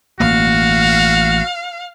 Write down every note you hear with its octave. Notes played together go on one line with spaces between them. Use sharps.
A1 A#3 F#4 F5